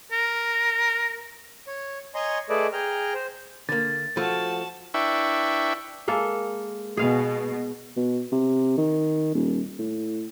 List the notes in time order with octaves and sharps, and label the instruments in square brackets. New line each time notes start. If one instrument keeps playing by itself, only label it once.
[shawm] A#4
[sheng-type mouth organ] C#5
C#5 D#5 G#5 A#5 C6 C#6
A3 G#4 A4 B4 D5 D#5
G#4 G5 A#5 F6
C5
[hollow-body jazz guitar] D3 A#3 [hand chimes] A6
[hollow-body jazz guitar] F3 A3 [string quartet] F#4 A5
[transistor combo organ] D4 E4 B4 E5 G5 C#6
[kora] G#3 A#3 A4
[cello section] B2 [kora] G#4 F5
[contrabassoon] B2
C3
D#3
D#1
A2